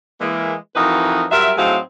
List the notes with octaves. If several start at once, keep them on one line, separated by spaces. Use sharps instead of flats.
E3 G#3 A#3
F2 E3 D#4 F#4 A#4 B4
F#3 G3 F4 A#4 E5
A2 F#3 C4 D#4 G#4 F5